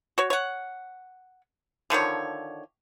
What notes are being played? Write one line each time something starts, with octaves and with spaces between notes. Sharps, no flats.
F#4 C#5
C#5 F#5
D3 D#3 F3 C#5